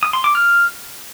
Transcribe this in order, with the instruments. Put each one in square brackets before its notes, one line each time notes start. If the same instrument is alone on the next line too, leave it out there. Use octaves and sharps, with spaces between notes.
[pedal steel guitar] D#6
C6
D6
F6